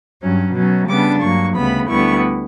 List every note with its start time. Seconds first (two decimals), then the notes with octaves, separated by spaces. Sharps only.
0.21 G2 F#3 C#4
0.54 B2 F#3 C#4
0.88 C#3 G3 B3 D4 D6
1.21 G2 F#3 A#3 C#6
1.55 D2 C#3 G3 B3 B5
1.88 D2 D3 G3 B3 E4 C#6